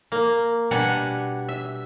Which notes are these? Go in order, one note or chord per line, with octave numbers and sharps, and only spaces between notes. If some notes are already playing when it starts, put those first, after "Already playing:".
A#3
B2 G3 D4 F#5 G#5
E5